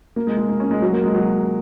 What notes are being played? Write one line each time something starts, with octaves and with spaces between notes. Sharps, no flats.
A#3
G#3
G#3
A#3
C#4
G#3
F#3
A#3
G#3
F#3